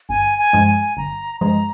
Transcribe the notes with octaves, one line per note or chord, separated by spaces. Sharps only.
G1 G#5
G#5
G2 F3 G#3
G#5
G1 A#5
G2 F3 G#3 A#5